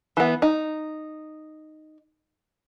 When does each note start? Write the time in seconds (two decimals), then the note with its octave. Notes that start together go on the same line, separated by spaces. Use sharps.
0.17 E3 B3
0.42 D#4